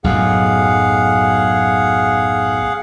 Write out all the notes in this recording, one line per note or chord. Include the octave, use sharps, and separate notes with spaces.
B1 F#2 A2 G#4 F5 F#5